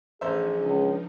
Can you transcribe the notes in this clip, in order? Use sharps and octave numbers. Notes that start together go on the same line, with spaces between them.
A1 F3 D4 D#4 G#4 C5 E5
C#2